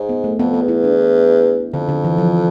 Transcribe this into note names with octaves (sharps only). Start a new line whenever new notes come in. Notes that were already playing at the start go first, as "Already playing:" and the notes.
Already playing: G#2
B3
A3
F2 B3
B3
E2
E4
D4
F2 D3
D3
E3
F3